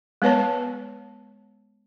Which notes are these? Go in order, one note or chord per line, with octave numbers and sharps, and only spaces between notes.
G#3 B3 B4 C#5 A5